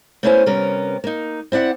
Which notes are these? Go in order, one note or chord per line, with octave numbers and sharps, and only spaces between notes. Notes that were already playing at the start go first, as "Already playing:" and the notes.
A3 B3 C#4 E4 C5 G#5
C3 G3 B3 C#4 A#4
A#3 D#4
C4 E4 D5 F#5